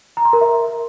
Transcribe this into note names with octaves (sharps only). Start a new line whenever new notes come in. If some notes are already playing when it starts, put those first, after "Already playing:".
A#5
C6
A#4
E5